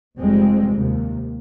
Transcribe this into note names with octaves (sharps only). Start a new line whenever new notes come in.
F1 F2 G3 G#3 C4
D#2 C3